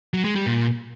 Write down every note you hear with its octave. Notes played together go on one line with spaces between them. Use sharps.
F#3
G#3
G3
A#2